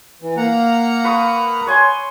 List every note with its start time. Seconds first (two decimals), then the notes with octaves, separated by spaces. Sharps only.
0.22 E3
0.37 A#3 F#5 A#5
1.04 B4 C#6 D#6
1.67 C#5 G#5 C6